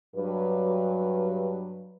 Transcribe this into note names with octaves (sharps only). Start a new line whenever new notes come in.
G2 F#3 B4